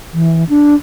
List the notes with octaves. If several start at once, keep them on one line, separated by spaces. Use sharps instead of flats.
E3
D4